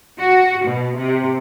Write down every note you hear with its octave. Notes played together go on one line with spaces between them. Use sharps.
F#4
B2
C3